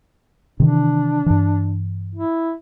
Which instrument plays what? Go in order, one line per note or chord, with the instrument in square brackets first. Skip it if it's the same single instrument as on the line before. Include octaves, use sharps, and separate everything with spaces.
[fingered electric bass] C3 D#3 E3 [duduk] D4
[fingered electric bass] G2 E3
[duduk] E4